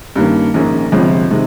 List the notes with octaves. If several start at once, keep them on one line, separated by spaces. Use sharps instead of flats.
G2 D#3 A#3 C#4
A#1 G#2 D#3 A#3 C#4
G1 F2 C3 F3 G#3
C3 D#3 G#3